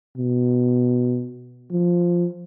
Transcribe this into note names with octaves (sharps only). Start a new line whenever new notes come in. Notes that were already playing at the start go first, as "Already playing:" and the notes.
B2
F3